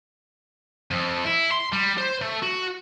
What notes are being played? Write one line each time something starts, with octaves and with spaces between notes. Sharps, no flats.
F2
E4
C6
G3
C5
A3
F#4